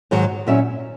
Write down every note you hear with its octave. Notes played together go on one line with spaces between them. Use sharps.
G#2 D#3 F#3
A#2 F#3 C#4 E4 E5